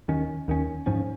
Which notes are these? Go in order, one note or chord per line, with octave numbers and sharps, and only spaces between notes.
D#2 D#3 C#4
D#2 D#3 C#4
G#2 F3 C#4